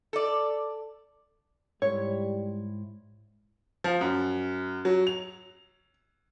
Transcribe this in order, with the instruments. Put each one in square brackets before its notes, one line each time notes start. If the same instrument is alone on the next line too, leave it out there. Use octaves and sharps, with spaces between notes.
[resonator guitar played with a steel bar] A4 D5
[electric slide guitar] G#2 E4 [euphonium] G3 [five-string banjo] C#5
[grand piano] F3
F#2
F#3
F7